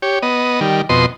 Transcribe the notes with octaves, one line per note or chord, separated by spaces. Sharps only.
G4 C#5
B3 D#5
D#3 G3
F2 B2 D#5 C6